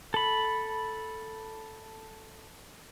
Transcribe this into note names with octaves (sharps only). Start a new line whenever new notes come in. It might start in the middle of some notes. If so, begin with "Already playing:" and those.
A4 B5